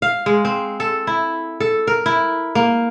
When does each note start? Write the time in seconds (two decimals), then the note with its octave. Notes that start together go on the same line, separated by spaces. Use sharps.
0.02 F5
0.26 G#3
0.45 C4
0.80 A4
1.07 E4
1.60 A4
1.87 A#4
2.06 E4
2.55 A#3